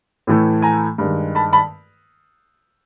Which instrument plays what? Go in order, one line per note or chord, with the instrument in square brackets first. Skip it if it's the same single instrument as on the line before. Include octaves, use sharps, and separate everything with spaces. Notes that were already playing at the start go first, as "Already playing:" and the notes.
[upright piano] A2 E3 A3
G#5 A#5
G2 D#3 G#3
A5 B5
A5 B5